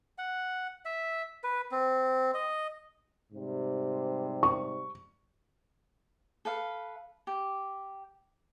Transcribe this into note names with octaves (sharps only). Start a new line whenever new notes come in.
F#5
E5
B4
C4
D#5
G#2 C3 G3
C#6
A4 B4 F5
G4